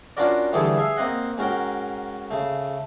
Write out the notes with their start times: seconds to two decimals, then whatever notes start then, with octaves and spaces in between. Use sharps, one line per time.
0.17 C#4 D4 F4 F#4 A#4 D5
0.52 D3 E3 G3 A3 G#4 A4
0.77 G#4 E5 F5
0.97 A#3 C4 D#5 F#5
1.38 G#2 C#4 F#4 A#4 G5
2.31 C#3 A3